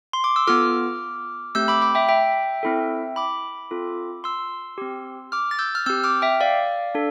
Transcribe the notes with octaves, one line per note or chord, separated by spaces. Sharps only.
C6
D6
E6
B3 F4 A4 D6 F6
A3 C4 G4 E6 G6
B5 D6
B5 D6
E5 G5
E5 G5
C4 E4 A4
B5 D6
C4 F4 A4
C6 E6
C4 G4
D6 F6
A6
E6 G6
F6
C4 G4 E6 G6
D6 F6
E5 G5
D5 F5
D4 A4